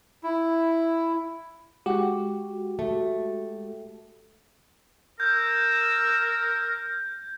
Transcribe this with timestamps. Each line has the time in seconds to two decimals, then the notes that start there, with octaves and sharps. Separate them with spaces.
0.23 E4
1.86 G#3 F#4 G4
2.79 A3
5.20 A#4 E6 G6 G#6